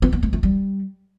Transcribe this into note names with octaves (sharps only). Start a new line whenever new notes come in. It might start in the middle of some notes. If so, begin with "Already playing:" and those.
B3
B3
A3
A3
G3